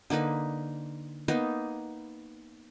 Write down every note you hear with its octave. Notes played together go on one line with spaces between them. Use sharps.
D3 A#3 D#4 B4
A#3 B3 D#4 B4